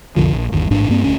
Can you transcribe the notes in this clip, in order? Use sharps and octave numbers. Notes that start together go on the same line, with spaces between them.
B1 F2 D3 F3
A#1
G1 D#2
A1 G#2 D4
G2 A#3 C4
F#1 D2 C#4